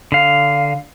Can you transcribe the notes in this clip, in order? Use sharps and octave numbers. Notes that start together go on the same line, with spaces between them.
D3 F5